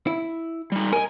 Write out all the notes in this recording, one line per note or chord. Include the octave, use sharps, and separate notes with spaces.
E4
G3 D#4
A#4 D#5 G#5